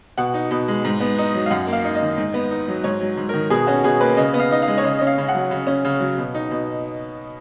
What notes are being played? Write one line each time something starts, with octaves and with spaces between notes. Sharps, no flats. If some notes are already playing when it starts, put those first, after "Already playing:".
B2 F#5
D#4
B2
G#3
G#2
B3
D#4
F#3
F5
F#2 F#5
A#3
F5
D#4
D#5
D#3
G#2
B3
D#4
F#3
G#2 C#5
F#3
G#2
D#3 A#4
B2 G#4
C#4 F#4
B2 G#4
A#3 B4
C#3 D#5
B3
F5
D#4 D#5
F5
G#3
C#5
C#3 D#5
D#5
C#4
F5
C#3
F#5
F#3
C#3
C#4
C#3
F#3
B2
D#4
B2